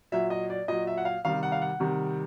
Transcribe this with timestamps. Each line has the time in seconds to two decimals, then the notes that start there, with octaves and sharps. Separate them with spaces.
0.12 A#2 F#3 E5
0.30 D#5
0.50 D5
0.68 A#2 F#3 D#5
0.87 E5
0.97 F#5
1.05 F5
1.25 C3 D#3 G3 F5
1.43 F#5
1.52 F5
1.61 F#5
1.80 C3 D#3 G3